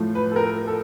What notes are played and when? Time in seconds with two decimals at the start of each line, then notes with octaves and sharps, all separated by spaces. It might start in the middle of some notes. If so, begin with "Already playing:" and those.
Already playing: A2 F3 A3
0.15 B4
0.31 A4
0.36 A#4
0.67 A4